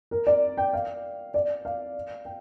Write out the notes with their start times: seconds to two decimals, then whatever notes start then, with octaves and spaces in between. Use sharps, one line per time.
0.11 A#4
0.27 D5
0.58 G5
0.73 F5
1.34 D5
1.65 F5
2.25 G5